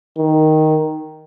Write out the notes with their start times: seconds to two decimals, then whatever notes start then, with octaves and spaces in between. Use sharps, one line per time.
0.18 D#3